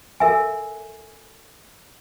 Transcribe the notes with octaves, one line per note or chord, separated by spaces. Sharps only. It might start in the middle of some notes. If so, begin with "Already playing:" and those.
A4 A#4 E5 G#5